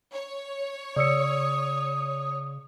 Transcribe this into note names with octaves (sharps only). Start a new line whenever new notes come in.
C#5
C#3 D5 D#6 E6 C#7